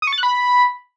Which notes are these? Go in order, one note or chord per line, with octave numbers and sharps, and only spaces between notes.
D#6
C#6
A6
F#6
B5